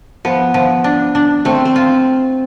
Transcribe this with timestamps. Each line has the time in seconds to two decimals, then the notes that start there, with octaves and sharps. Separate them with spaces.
0.25 F3 B3
0.54 F3
0.84 D4
1.15 D4
1.45 A3 C4
1.65 C4
1.76 F4